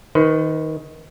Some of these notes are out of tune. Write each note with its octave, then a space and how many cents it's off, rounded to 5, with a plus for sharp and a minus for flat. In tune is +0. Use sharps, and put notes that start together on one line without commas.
D#3 +15 B4 +45